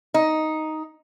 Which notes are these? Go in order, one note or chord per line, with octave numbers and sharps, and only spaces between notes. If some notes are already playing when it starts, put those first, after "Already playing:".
D#4